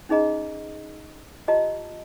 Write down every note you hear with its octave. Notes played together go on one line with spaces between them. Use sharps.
C#4 D#4 G#4 D#5 A#5
F4 G4 D#5 A5 A#5